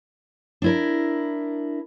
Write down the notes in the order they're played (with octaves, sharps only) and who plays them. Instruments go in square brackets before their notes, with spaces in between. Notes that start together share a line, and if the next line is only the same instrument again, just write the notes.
[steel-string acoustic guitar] D4 E4 A#4